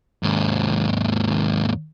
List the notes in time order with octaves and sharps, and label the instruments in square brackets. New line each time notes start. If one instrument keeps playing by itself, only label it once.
[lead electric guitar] D#2 G#2